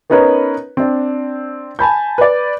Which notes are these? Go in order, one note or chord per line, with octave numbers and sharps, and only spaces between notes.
B3 C#4 D#4 A#4 B4 C#5
C4 D4
G#5 A5 B5 G6
B4 D5